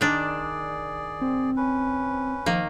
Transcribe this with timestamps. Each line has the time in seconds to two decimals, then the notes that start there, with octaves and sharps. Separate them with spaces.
0.01 D#3 D4 G#4 D5
1.21 C4
1.56 C#4 B4
2.46 D#3 F3 A#3